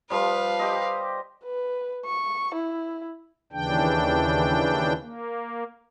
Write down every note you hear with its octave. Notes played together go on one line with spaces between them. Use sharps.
F3 G3 B4 F5
G4 C5 D#5
B4
C#6
E4
D#2 C#3 E3 D4 G5
A#3